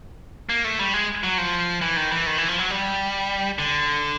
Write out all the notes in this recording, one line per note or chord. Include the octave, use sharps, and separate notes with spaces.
A#3
A3
G3
G#3
F#3
F3
E3
D#3
E3
D#3
E3
F3
F#3
G3
D3